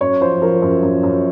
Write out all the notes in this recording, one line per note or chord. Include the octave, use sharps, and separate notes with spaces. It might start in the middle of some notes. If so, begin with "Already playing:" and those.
F#2 C#5
F3 C5
F3 A#4
F#2
F#2
F#2